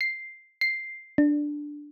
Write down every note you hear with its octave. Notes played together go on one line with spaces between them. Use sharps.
C7
C7
D4